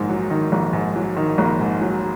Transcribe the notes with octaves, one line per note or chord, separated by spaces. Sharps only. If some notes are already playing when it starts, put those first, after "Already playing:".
Already playing: A#1 G#2 D#3
F#3
D#3
A#1
G#2
F#3
D#3
A#1
G#2
F#3